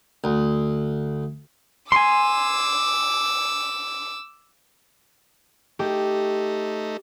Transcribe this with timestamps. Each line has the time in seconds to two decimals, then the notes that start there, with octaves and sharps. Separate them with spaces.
0.24 D2
1.92 G#5 C6 D6 E6
5.79 A3 D#4 G4